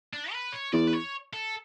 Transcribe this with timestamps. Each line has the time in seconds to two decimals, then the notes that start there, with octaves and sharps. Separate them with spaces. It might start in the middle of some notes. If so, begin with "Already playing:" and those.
0.13 D4
0.32 B4
0.53 C#5
0.72 E2 D5
0.87 B4
0.93 C#5
1.33 A4